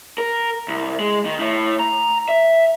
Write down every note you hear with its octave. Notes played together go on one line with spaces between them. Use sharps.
A#4
C2
G#3
D#3
A2
A#5
E5